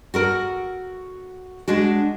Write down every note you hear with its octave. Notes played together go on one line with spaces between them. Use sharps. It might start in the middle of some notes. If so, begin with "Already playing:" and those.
F#4 A4 A#4
G#3 D4 F#4